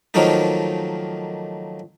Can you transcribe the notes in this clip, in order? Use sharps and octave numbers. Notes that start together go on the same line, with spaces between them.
D#3 F3 F#3 A3 A#3 D#4